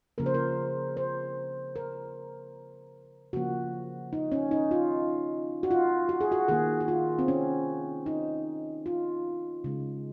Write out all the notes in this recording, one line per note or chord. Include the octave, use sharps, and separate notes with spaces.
C#3 F3 A#3 A#4
C5
A#4
C5
A#4
C#3 F3 A#3 F#4
D#4
C#4
D#4
F4
F#4
F4
F#4
G#4
F#4
D#3 A#3 G#4
F#4
F4
C4
C#4
D#4
F4
C#3 G#3